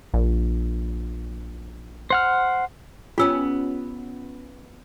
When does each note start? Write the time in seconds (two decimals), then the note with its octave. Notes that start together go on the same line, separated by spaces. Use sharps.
0.14 A#1
2.10 C5 F#5 F6
3.18 B3 C#4 F4 G4 E6